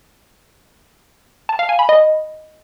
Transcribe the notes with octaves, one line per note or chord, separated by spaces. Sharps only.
A5
F5
G#5
B5
D#5